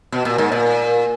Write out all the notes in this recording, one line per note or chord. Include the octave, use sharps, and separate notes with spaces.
B2
A#2
G#2
A#2